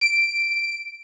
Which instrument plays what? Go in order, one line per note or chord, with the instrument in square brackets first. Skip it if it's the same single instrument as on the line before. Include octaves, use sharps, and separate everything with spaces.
[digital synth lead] D7